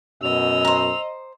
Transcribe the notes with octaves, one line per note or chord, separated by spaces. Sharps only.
F#2 B2 D#5 E6 F7
C5 A#5